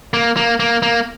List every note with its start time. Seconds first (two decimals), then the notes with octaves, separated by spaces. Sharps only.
0.14 A#3
0.37 A#3
0.60 A#3
0.82 A#3